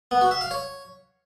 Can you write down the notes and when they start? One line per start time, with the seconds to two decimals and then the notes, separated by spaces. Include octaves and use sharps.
0.11 B3
0.21 F#4
0.31 E5
0.41 F5
0.51 C#5